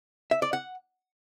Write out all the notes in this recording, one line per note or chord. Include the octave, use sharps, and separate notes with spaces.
E5
D5
F#5